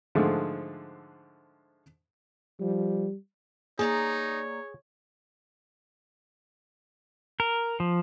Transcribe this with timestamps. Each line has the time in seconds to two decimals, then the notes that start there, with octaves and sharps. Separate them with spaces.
0.15 G#2 D3 F3 G#3 A3
2.60 F3 G3
3.79 A#3 D#4 G#4 C#5 D5 A#5
7.40 A#4
7.80 F3